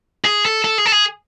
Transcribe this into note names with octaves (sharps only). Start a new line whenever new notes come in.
G#4
A4
A4
G#4
A4
G#4